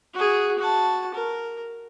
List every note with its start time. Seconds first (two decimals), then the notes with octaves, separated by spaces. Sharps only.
0.14 F#4 G#4
0.59 F#4 A5
1.15 A#4